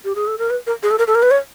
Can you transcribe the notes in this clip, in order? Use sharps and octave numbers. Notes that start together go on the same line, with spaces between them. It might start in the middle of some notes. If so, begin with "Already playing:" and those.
G4
G#4
A4
A#4
B4
A#4
G#4
A4
A#4
A4
A#4
B4
C#5